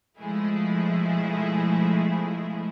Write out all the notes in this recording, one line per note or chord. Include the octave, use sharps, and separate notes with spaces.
B2 F3 G#3 A3 E4 G#4